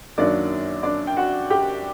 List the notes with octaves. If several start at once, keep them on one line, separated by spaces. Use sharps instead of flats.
F#2 D#3 F#3 A#3 D4 D5
D4 D5
G5
F#4 F#5
G4 G5